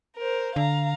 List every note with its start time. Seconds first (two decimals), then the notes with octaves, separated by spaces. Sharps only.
0.17 A#4 C5
0.56 D3 F5 A#5